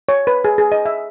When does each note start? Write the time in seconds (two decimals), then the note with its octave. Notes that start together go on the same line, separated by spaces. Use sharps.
0.09 C#5
0.27 B4
0.45 G#4
0.58 G#4
0.72 D#5
0.86 E5